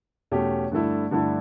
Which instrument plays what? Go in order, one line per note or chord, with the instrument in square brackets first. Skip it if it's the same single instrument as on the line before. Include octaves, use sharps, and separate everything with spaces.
[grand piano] E2 B2 A3 C#4 G4
G2 D3 A3 E4
G2 D3 A3 E4